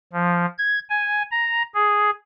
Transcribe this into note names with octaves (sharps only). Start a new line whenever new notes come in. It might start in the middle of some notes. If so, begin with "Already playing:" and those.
F3
G#6
G#5
A#5
G#4